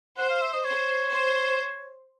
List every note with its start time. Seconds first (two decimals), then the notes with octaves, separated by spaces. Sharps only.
0.18 C5 F#5
0.30 F5
0.42 E5
0.53 D#5
0.65 C5 C#5
1.11 C5